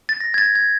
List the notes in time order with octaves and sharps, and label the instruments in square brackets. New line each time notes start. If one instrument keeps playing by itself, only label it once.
[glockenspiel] A6
A#6
G#6
A6
G#6